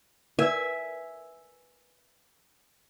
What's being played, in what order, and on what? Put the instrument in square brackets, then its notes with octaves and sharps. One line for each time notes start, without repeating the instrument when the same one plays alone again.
[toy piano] A#4 B4 D5 [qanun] E5 G#5